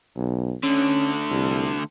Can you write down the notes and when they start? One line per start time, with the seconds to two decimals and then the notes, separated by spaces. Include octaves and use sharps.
0.16 B1
0.63 D2 D3 C#4
1.31 C2